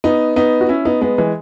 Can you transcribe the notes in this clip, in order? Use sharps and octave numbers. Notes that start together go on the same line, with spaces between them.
B3 D#4
B3 D#4
F#4
C#4 E4
B3 D#4
G#3 B3
E3 G#3